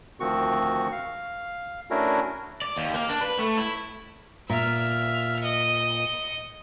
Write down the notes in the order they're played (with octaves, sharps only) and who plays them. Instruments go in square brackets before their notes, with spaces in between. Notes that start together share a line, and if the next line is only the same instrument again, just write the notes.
[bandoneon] D2 D#3 F3 C4 F#4 C#6
F5
A3 C#4 D4 E4 F#4 A#4
[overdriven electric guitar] D5
D#2
A#3
D4
B4
A3
E4
[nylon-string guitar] A#2 [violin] E5 F6
[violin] D#5 C#7